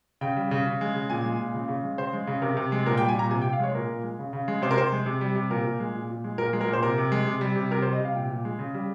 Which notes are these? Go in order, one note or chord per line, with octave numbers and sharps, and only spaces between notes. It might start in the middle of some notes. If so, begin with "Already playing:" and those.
C#3 G5
G3
C#3
C#3
G#3
C#3
A#2 G#5
G#3
A#2
C#3
C#3
G#3
C#3 C5
G#3
C#3
C3 A#4
C3
G#3
A#2 A#4
G5
G3
G#5
A#2 A#5
C3 G#5
G5
C3
F5
G#3 C#5
A#2 A#4
A#2
G#3
C#3
C#3
G#3
C3 C5
A#4
C3 C5
G#3
C3
G3
C3
A#2 A#4
A#2
G#3
A#2
A#2
G#3
A#2 A#4
G#3
A#4
A#2 C5
C3 A#4
C3
G#3
C3
G3
C3
C3 A#4
C5
G3
D#5
C3 F5
A#2 G5
A#2
G#3
C#3
G3